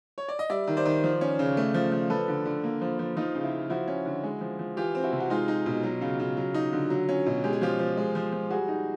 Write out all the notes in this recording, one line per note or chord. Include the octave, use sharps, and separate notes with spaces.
C#5
D5
D#5
G3 D5 E5
D#3
C5 D5
D#3
F3
C#4
C#3
A3
F3
F3
F3 A4 B4
D3
D3
A#3
F3
F3
F3 D#4 F4
C#3
E4
C#3
F3 E4 F#4
C#4
D3
G#3
F3
F3
E3 F4 G4
C4
E4 F#4
C3
F#4
G#3 D#4 F4
D#4
B2
F#3
C#3
C#3
F#3
D#4
D3
F#3
C#4
B2
G#3 G4
G#4
F3 F4 G4
F3
G#3
F3
F3
G3 F#4 G#4
D#4